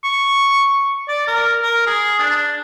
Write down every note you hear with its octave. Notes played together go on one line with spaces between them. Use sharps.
C#6
D5
A#4
A#4
G#4
D4